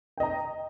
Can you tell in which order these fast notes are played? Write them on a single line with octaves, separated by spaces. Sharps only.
G5 D#5 A#5